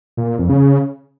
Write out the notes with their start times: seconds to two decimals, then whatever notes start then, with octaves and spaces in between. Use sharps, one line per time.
0.17 A#2
0.28 A#2
0.39 F2
0.49 C#3